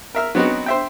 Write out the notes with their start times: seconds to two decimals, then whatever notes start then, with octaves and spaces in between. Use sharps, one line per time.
0.15 A#4 E5 F6
0.35 F#3 B3 C4 D#4 F#4
0.66 C5 E5 G5